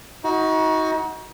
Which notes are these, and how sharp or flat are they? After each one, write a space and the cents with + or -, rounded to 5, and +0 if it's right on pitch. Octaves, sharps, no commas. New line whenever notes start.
D#4 +35 F#4 +0